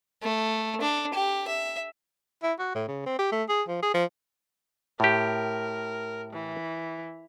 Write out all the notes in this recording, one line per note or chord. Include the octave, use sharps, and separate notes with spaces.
A3
D4
G4
E5
E4
F#4
A2
C#3
C4
G4
A3
G#4
F3
G#4
F3
A2 G4 A#4
E3